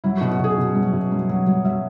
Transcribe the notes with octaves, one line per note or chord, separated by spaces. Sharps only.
F#3 E4
B2 F#4
F#4
B2 G#4
B2
F#3
B2
F#3
F#3
F#3
F#3 E5